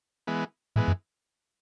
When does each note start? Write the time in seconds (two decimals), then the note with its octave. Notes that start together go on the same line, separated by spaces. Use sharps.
0.27 E3 G#3 B3
0.76 A2 E3 G#3 B3
0.88 F#2